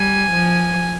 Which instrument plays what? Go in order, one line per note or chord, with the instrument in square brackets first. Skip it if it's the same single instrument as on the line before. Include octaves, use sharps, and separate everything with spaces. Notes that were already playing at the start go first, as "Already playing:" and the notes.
Already playing: [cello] G3 [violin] G#5
[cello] F3